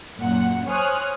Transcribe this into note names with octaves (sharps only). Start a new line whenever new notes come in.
F#2 A#2 F#5
C5 C#5 G#5 D#6 F6 F#6